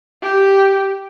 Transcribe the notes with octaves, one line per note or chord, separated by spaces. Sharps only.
G4